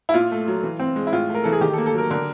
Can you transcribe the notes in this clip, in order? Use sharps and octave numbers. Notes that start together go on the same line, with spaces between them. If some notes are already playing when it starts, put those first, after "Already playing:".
E4
A#2 F4
A3
F#3
E3
C4
G#3
E4
A2 F4
A3
A#4
E3 A4
G#4
D#3 G4
A4
A#3
A4
F#3 A#4
D3 A#4